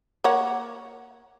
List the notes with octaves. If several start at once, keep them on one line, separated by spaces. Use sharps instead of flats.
A#3 C#5 F#5